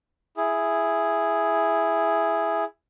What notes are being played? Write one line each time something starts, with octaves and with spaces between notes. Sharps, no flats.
E4 G#4